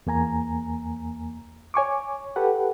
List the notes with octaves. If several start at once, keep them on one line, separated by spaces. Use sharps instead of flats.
E2 A#3 G#5 A#5
C#5 G#5 C#6 D6
G4 A4 B4 F#5